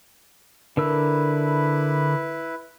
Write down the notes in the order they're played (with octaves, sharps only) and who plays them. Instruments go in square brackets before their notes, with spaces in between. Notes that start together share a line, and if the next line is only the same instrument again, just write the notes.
[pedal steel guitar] D3 A#4 E6 [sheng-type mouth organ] E4 B4